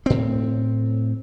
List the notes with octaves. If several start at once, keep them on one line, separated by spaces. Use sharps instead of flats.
A2 C4